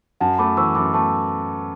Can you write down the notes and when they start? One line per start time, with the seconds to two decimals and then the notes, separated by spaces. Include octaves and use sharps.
0.20 F#2 F#5 A5
0.38 A3 B5 D6
0.57 E3 C#6 E6
0.75 F#2 B5 D6
0.94 A3 A5 C#6